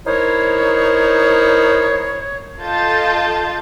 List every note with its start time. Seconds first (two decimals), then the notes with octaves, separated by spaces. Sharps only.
0.05 D#4 E4 A#4 C5 C#5
2.61 F4 A4 D#5 A5 G6 A6